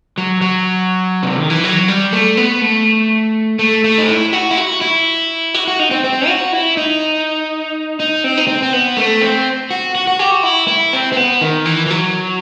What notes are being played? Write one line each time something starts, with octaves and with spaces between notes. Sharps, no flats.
F#3
F#3
C3
D#3
E3
F#3
G3
A3
B3
A3
A3
A3
D#4
E4
F#4
E4
F#4
E4
F#4
F#4
D#4
C4
C4
F#4
E4
D#4
D#4
C4
D#4
C4
C4
B3
A3
C4
F#4
F#4
F#4
G4
F#4
E4
E4
C4
C4
B3
D#3
E3
E3
F#3